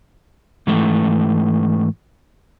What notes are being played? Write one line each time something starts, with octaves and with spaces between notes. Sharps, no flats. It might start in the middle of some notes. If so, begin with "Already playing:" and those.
G#2 E3 A3